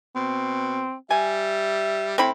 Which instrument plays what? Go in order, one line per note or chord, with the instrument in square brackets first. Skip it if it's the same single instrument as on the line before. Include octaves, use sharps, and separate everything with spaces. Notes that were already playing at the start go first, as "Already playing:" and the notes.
[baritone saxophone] B2 [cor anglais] C4
[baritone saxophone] G3 [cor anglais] E5 [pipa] G#5
[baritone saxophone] A2 [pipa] C4 E4 B5